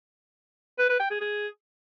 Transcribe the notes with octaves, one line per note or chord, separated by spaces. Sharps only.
B4
B4
G5
G#4
G#4